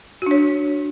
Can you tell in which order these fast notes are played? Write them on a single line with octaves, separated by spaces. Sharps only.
F#4 D4 C#5